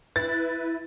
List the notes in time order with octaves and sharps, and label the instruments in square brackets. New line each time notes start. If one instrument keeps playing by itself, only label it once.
[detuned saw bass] E4 [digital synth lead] B4 [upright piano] A6